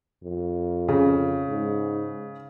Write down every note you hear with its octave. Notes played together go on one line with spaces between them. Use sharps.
F2
C#3
G#2